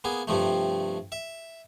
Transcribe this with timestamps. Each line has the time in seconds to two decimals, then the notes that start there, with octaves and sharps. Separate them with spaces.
0.04 A#3 B3 G#4
0.27 G2 C3 F3 A3
1.12 E5